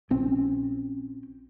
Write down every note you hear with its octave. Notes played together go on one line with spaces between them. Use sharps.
A#1 C4 C#4